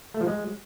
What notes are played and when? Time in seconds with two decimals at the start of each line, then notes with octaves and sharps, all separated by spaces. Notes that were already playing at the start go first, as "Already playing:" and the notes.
0.14 A3
0.21 F3
0.27 G#3